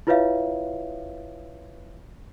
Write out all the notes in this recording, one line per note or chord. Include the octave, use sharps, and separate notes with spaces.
E4 F4 B4 C#5 E5 F5